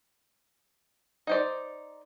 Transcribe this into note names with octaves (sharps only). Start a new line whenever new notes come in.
D#4 C5 D5